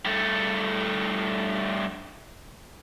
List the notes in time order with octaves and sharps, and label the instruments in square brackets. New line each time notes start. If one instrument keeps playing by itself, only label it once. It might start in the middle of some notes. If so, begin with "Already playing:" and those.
[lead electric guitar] G2 A3